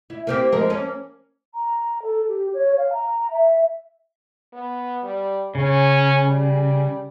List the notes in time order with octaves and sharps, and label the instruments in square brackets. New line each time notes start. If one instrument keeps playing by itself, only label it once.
[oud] E4
A#3 C4 G4
F3 G#3 A#4
A#3 C#4
[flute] A#5
A4
G4
C#5
F5
A#5
E5
[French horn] B3
G3
[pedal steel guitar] C#3 [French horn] C#4
[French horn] G3